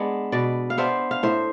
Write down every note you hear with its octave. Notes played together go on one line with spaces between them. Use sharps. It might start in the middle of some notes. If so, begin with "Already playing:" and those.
Already playing: G#3 B3 D4
B2 B4 D5
F5
B3 D4 C5 E5
F5
A2 C5 E5